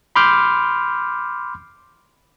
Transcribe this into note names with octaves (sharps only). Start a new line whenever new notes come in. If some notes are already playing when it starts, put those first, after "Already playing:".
B5 C6 D6 F6 G6